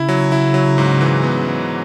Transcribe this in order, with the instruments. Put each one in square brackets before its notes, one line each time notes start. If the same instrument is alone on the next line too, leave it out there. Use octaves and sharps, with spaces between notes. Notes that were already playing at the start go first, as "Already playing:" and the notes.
Already playing: [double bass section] C#3 [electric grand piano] E4
[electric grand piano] F#3
E4
F#3
G#2
E3
B3
G#2